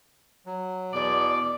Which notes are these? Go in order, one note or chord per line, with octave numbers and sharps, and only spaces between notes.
F#3
E2 B2 D5